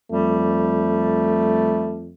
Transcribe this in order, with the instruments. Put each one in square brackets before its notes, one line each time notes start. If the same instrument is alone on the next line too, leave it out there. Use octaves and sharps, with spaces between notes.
[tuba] F2 [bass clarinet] G3 [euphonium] A3